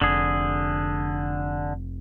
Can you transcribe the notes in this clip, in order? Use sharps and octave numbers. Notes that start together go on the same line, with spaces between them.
F1 D3 G#4